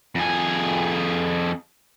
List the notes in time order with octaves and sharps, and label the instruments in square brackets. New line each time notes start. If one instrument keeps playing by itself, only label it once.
[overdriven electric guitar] F2 G#4